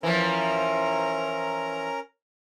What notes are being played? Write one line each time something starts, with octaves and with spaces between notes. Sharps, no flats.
E3 F3 C#4 A#4 A#5